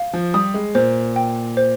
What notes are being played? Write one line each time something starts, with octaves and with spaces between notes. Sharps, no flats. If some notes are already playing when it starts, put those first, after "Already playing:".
Already playing: F5
F3
G3 D#6
G#3
A#2 C5
G5
C5